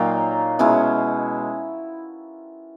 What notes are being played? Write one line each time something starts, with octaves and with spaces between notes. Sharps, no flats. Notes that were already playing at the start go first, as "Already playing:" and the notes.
Already playing: A#2 F#3 A#3 D#4 F5 G5
B2 G#3 C#4 E4